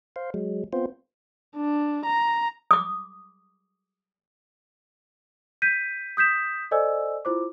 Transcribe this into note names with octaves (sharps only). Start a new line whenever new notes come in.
C5 F5
F#3 G#3
B3 C4 F4 C5
D4
A#5
D6 D#6
G6 B6 D#7
D#6 G6 B6 E7
A4 C5 D5 D#5 G#5 E6
E4 F4 C5 D6